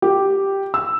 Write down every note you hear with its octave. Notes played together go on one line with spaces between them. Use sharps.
G4
E6